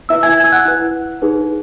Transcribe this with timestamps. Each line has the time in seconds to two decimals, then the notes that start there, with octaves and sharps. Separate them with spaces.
0.09 E4 B4 E5 E6
0.23 G#5 G#6
0.38 G#5 G#6
0.44 E6
0.52 F#5 F#6
0.65 E4 B4
1.22 D#4 G#4 B4